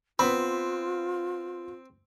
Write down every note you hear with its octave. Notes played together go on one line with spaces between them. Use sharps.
B3 C4 F4 B5